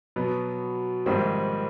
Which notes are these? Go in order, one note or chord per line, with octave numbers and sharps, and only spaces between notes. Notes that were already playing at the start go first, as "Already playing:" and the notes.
B2 F#3 B3
A#1 G#2 D#3 G3 C4